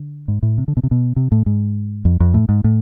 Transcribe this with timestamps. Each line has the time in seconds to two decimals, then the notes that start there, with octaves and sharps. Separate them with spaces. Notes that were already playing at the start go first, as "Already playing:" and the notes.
Already playing: D3
0.28 G#2
0.43 A2
0.58 C3
0.68 D3
0.77 B2
0.83 C3
0.91 B2
1.16 C3
1.32 A2
1.46 G#2
2.05 F2
2.20 F2
2.34 A2
2.49 G#2
2.64 A2